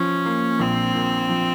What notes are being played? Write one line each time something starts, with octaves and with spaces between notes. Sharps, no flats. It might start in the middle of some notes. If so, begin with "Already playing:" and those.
Already playing: F3 C#4
A#3
A#1 C4
A#2
F3